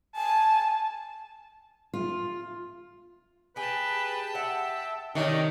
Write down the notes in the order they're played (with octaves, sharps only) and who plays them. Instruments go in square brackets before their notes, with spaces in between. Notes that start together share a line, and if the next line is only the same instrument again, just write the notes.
[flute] G#5 [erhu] A5
[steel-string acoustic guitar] F4
[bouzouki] G4 G#4 [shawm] B4 [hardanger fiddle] G5 A5
[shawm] E5 [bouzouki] F#5
[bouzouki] C3 F#3 A3 [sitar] D#3 [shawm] D#4 [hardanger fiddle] C#5 D5